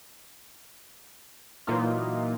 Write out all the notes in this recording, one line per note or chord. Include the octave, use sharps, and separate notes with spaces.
A#2 E3 F#3 A#3 D#4 F4